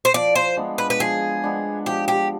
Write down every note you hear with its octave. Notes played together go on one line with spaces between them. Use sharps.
C5
F3 D5
C5
G#3 B3 D4
B4
B4
F3 G#4
G#3 B3 D4
F3 G4
G4